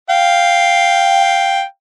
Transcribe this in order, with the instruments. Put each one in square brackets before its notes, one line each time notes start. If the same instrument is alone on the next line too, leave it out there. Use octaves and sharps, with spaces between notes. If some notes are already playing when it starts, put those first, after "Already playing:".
[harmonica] F5 G5